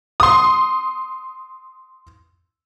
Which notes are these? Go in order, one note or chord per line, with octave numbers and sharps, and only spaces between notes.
C6 D#6